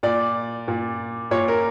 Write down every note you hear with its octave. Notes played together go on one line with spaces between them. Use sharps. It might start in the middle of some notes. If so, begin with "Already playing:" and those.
A#2 D5
A#2
A#2 C#5
A#4